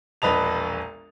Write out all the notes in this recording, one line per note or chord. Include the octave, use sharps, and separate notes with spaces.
E1 A#1 B4 D#5 A5 F7